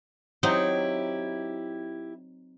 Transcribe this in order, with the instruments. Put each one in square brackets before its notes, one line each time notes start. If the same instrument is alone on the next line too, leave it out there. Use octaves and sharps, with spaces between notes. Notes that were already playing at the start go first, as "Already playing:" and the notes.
[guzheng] F#3 C4 D#4 [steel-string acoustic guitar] E4 G4